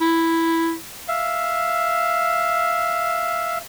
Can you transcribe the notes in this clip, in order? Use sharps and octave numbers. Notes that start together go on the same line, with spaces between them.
E4
E5 F5